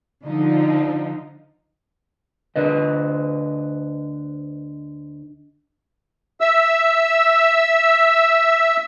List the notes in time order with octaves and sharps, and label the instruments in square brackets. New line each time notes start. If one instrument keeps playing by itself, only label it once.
[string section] D3 F3 D#4
[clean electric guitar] D2 D3 B4 D#5
[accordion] E5 E6